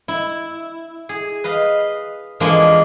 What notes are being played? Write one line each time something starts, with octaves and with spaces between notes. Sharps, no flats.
E4
G#4
B4 D#5 F5
E3 F3 G#3 A#3 D4